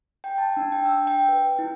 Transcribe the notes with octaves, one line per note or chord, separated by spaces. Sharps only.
G5
A5
D4
G5
E6
G5
B4
E4